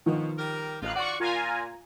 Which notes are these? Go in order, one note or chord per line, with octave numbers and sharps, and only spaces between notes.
B2 D#3 F3
G3 G4 A#4
A1 F2 D#4 F4 F5 F#6
F4 F#4 D5 F#5 C#6
A#2 F4 G#5 A#5